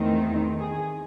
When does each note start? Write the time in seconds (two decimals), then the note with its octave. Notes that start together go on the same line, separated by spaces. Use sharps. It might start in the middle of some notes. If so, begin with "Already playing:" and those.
Already playing: E2 D#3 A3 C4 D#4
0.59 G#4